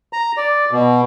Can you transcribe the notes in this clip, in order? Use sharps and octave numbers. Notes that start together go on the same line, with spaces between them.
A#5
D5
B2